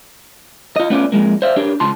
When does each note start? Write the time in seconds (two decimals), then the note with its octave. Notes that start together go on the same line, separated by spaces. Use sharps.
0.76 F4 D#5
0.90 A3 B3 C#4 F4 D5
1.12 F2 F3 G#3 A#3
1.42 C5 D5 E5 F5
1.56 D4 G4 A#4 C#5
1.80 C#2 F4 A5 C6